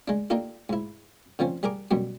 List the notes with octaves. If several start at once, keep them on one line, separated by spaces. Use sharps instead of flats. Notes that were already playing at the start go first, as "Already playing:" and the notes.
G#3 D4
A#3 D4 D#4 F4 G4 A4
G#2 E4
D3 F3 C4 C#4
G3 G#4 A#4 D6
F#2 B2 G3 D4